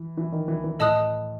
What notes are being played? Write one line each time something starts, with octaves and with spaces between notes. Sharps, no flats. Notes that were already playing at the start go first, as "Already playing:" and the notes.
Already playing: E3
E3
D#3
E3
E3
A2 A4 D#5 A5 D#6 F#6